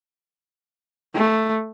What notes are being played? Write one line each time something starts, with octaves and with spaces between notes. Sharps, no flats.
A3